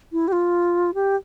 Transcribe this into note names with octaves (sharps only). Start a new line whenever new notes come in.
E4
G4
F4
G4